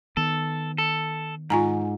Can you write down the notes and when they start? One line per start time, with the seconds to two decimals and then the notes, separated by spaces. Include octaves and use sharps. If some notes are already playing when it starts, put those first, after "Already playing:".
0.17 D#3 B3 A4
0.78 A4
1.50 G#2 F4 G#5 A#5